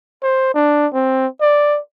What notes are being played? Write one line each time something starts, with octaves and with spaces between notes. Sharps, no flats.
C5
D4
C4
D5